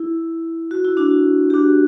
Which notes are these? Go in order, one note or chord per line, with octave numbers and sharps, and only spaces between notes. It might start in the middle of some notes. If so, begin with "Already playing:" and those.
Already playing: E4
F#4
E4
D4 F#4
G4
D4 F#4